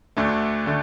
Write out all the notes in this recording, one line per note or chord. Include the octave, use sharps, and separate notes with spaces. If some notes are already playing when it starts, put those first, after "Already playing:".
D2 D3 A3
D3 A3